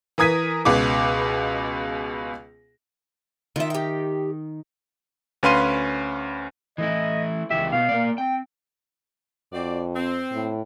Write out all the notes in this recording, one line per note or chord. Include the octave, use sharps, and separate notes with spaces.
E3 A#4 D#6 G#6 B6 D#7
C#2 B2 B3 D6
D#3 D#4 F4 E5
G4 G5
D2 C#4 B4 F5 C6 D#7
E3 A3 E4 D#5
C#2 E3 G4 E5
B2 B3 F5
A#3 D5
C4 G5
F2 C4 F#4 D5
C4
A2